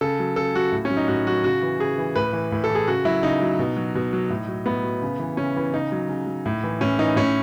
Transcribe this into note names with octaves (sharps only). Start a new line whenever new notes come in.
C#3 A4
F#3
C#3 A4
F#3 F#4
A2
C#4
F#3
D#4
A2 F#4
F#3 F#4
C#3 F#4
E3
C#3 G#4
E3
A2 B4
E3
A2
A4
E3
G#4
C#3 F#4
F#3 E4
C#3 D#4
F#3
B2
F#3
B2
F#3
A2
F#3
A2 B3
F#3
C#3
E3
C#3 C#4
E3
C#3 D#4
F#3
C#3
F#3
A2
E3
A2 C#4
E3 D#4
A2 C#4